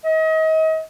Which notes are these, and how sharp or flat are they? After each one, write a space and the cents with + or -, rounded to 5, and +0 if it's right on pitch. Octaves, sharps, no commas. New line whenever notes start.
D#5 +35